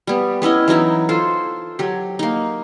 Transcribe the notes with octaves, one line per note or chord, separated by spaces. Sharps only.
G3 B3
B3 C#4 E4 D#5
E3 F#3 D#4 E4
F4 A4 C5
F#3 G4
A#3 D#4